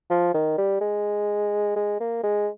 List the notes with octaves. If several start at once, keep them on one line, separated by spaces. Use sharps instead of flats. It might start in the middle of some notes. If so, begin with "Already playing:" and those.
F3
D#3
G3
G#3
G#3
A#3
G#3